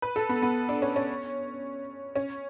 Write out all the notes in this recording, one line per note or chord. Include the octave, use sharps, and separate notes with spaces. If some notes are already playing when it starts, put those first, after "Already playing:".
B4
A4
B3
B3
D4
C#4
C#4
C#4